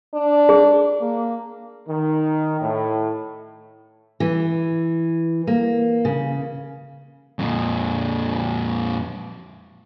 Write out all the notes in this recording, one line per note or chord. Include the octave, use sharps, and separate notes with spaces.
D4
G#4
A#3
D#3
A2
E3
A#3
C#3
F2 A#2